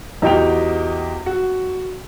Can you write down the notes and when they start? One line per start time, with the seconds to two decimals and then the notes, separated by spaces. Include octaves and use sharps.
0.22 E2 D#4 F#4 G4 G5 F7
1.26 F#4